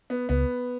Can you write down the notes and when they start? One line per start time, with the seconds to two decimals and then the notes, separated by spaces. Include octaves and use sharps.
0.10 B3
0.29 C#2 B3